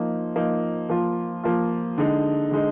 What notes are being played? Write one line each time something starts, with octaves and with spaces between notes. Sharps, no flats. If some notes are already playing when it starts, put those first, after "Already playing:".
Already playing: F3 A#3 D#4
F3 A#3 D#4
F3 A#3 F4
F3 A#3 F4
D3 G#3 D#4
D3 G#3 D#4